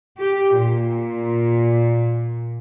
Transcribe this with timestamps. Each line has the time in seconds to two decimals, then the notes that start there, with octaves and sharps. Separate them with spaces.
0.20 G4
0.57 A#2